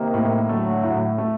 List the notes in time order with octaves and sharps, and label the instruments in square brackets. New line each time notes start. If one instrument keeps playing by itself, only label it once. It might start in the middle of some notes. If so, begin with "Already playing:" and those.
Already playing: [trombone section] C3 D#3 [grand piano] A#3
[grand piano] A2
[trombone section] D3 F#3 [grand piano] A3
[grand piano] A2
A3